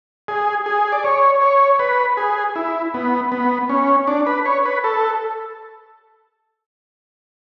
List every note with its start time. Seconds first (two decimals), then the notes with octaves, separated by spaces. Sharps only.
0.28 G#4
0.66 G#4
0.92 D5
1.04 C#5
1.42 C#5
1.79 B4
2.17 G#4
2.56 E4
2.94 B3
3.32 B3
3.69 C#4
4.07 D4
4.27 B4
4.45 C#5
4.66 B4
4.84 A4